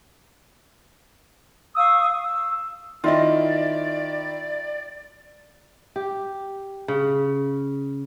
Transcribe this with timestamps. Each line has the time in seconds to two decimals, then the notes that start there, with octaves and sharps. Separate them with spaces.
1.76 F5 C#6 D#6 E6
2.22 E6
3.04 D#3 E4 F4 D5 D#5
5.96 G4
6.88 C#3